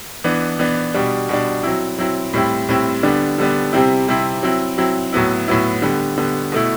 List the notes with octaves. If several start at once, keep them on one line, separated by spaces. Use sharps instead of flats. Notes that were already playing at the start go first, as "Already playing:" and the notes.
E3 B3 D4
E3 B3 D4
B2 G3 D4
B2 G3 D4
F#3 C4 E4
F#3 C4 E4
A2 G3 C4 E4
A2 G3 C4 E4
D3 G3 B3 D4
D3 G3 B3 D4
C3 G3 C4 E4
C3 G3 C4 E4
F#3 C4 E4
F#3 C4 E4
A2 F#3 B3 E4
A2 F#3 B3 E4
D3 G3 B3
D3 G3 B3
B2 A3 E4